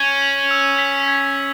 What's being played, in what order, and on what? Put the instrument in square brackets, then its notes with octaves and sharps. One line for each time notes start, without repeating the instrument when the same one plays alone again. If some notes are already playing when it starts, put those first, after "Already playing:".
Already playing: [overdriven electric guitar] C#4 [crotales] G#6
[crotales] F#7
E6
B6
G#6
F#7